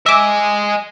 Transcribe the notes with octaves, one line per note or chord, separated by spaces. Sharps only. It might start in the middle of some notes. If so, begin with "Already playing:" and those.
D#5 E5 G#5 D6